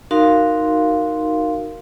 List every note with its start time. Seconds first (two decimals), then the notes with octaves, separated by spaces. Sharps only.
0.11 D#4 F#4 A#4 F5 C6